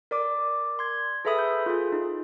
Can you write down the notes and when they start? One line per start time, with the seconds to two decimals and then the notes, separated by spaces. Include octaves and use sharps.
0.11 A#4 D5 D6
0.79 C6 G#6
1.25 G#4 A4 B4 E5 B5 D#6
1.39 G6
1.66 F4 G#4
1.92 D#4